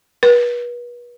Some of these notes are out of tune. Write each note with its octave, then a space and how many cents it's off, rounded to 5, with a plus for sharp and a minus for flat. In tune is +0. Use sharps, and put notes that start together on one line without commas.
B4 -35